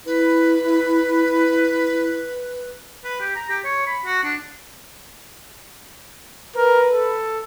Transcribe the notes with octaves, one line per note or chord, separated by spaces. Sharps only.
E4 B4
B4
G4
A#5
G4
C#5
B5
F#4
D4
A#4 B4
A4